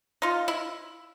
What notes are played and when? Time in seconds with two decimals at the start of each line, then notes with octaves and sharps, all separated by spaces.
0.22 D#4 F4
0.48 E4